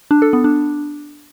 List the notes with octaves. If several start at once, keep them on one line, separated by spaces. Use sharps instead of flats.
D4
A4
B3
D4